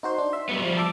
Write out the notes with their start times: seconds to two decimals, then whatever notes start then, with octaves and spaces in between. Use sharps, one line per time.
0.03 D#4 F#4 C5 C6
0.18 D4
0.33 E5
0.49 F#3 G3 B3
0.62 F3 G3 C5
0.77 A5 D6 E6